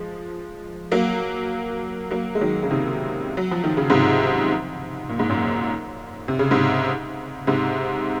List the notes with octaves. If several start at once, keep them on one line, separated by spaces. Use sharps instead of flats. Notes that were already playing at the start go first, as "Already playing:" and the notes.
Already playing: F3 G#3
F#3 A#3
F#3 A#3
G#3
D#3 F#3
C#3
C3 D#3
F#3
F3
D#3
C#3
G#2 C3
A#2
G#2
F#2 A#2
C3
C#3
G#2 C3
G#2 C3